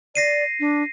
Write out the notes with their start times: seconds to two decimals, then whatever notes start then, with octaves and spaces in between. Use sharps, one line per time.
0.15 D5 A#6 C7 D#7
0.60 D4